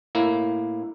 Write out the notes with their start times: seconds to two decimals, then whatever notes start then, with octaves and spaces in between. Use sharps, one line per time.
0.15 A2 A#3 E4